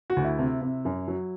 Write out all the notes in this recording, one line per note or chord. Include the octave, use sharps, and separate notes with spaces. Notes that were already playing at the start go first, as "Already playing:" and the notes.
F#4
D2
E4
C3
C3
F#2
F#3